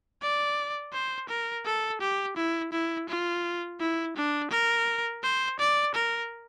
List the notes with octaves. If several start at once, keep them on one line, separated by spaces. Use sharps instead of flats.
D5
C5
A#4
A4
G4
E4
E4
F4
E4
D4
A#4
C5
D5
A#4